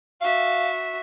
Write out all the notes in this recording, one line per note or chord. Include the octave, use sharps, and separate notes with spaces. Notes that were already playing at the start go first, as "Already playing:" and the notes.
F#4 E5 F5